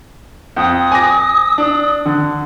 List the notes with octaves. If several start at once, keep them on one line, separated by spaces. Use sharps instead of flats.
F2 D#6
G#5 D6 A#6
D4
D3